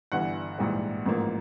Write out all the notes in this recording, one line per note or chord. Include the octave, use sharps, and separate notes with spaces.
G1 G2 E3 F#5
A#1 G#2 E3 G3
A1 G#2 F3 A#3